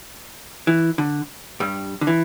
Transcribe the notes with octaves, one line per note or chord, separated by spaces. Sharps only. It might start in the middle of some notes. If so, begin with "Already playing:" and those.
E3
D3
G2 G3
D3
E3